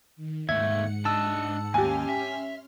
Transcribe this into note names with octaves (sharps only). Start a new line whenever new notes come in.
D#3
D#2 G#2 A3 E5 F#5 G#6 C#7
D4 D#5 A5 E6
D#2 C#4 G4 G#5 C6 F6
E5